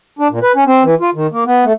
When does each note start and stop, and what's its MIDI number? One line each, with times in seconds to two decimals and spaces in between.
0.19 0.28 62
0.31 0.39 46
0.43 0.52 71
0.55 0.64 61
0.67 0.83 60
0.83 0.95 52
1.01 1.10 65
1.15 1.27 51
1.32 1.44 58
1.46 1.64 59
1.64 1.73 57